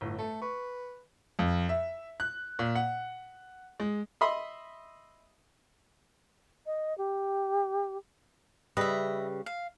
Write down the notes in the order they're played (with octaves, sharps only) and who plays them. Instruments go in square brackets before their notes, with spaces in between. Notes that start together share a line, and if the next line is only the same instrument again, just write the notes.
[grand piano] G1 A2
[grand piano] A3 [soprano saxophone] A4
[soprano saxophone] B4 [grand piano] C#6
[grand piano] F2
E5
F#6
A#2
F#5
G#3
[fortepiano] D#5 E5 B5 C6 D#6
[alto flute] D#5
G4
[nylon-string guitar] C#3 G3 B4 [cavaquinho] D#5 E5
[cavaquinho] F5